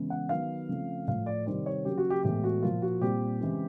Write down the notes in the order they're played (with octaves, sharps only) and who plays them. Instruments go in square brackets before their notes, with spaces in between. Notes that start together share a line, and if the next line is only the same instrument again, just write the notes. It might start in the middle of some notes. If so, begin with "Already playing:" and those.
Already playing: [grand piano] C#3 E3 G#3 B3
F#5
D#3 F#3 B3 F5
C#3 F3 A3 C4
A2 F3 A3 F5
D5
C3 D#3 G3 C4 D5
C#5
C#3 F#3 A#3 G4
F#4
G4
A2 E3 G#3 B3 G4
F#4
A#2 F3 A#3 F4
F#4
A#2 G3 C4 G4
C#3 E3 G#3 C4